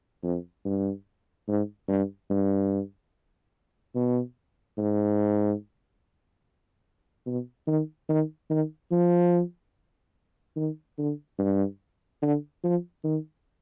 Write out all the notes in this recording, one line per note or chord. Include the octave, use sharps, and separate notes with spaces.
F2
G2
G#2
G2
G2
B2
G#2
B2
D#3
D#3
D#3
F3
D#3
D3
G2
D3
F3
D#3